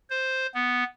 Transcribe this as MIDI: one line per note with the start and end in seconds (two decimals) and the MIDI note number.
0.10 0.47 72
0.54 0.84 59